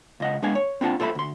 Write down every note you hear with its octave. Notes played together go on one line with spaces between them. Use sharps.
C#2 D#5 F#5
G#3 B3 D4 F5 G#5
C#5
C4 D4 E4 F4 F#5 A5
F4 A4 C5 E5 B5
D2 C6